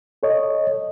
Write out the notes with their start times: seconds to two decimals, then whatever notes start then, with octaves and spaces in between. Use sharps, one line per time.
0.23 A4 C#5 D#5